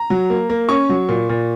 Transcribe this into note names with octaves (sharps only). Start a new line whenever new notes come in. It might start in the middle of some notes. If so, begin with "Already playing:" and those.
Already playing: A#5
F#3
A#3
A#3
C#4 C#6
F#3
A#2
A#2